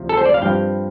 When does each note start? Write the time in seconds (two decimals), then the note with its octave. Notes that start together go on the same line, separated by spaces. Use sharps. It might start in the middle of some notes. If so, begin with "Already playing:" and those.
Already playing: D2 C3 F3
0.09 A4
0.17 C5
0.25 D5
0.34 F5
0.42 G2 F3 C4 G5